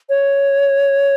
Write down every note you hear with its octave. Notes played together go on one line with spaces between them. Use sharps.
C#5